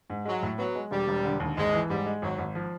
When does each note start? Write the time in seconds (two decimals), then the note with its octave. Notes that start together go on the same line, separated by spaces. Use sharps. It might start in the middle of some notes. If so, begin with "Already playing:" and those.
0.10 G#2
0.25 F#3 G#3
0.42 A2
0.58 F#3 B3
0.75 G#3
0.91 E1 G3
1.08 E1
1.25 D3
1.40 D#2
1.57 G#1 G#3
1.74 E3
1.89 G#2 G3
2.06 G#3
2.22 G#1 F#3
2.38 G#1
2.55 F3